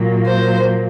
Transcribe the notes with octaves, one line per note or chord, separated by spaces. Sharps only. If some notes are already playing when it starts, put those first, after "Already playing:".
Already playing: A#2 F#3 A#3
C5